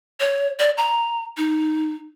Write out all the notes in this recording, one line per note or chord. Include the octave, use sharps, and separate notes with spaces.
C#5
D5
A#5
D#4